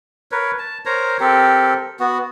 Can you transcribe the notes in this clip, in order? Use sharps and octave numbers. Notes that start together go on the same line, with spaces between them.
A#4 B4 C#5
A5
A#4 C5 C#5 A#5
C4 G4 A4 A#4
B3 F#4